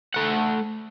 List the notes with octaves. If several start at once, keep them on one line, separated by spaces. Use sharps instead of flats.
A3 F#5